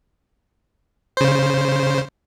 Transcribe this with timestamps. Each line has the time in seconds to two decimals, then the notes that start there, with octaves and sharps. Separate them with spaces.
1.17 C#3 C5